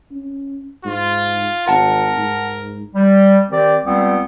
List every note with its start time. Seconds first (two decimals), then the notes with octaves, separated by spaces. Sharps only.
0.11 C#4
0.85 G#2 F4
1.68 G#1 A#4 F#5 A5
2.18 G#2
2.95 G3
3.50 D#3 C4 G4 D5
3.86 C#2 G3 B3 C4